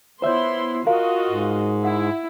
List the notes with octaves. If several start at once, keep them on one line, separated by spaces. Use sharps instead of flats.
B3 E4 F4 C5 C#5 E5 C6
F4 F#4 A#4 D#5 F5
G#2
E4 F#5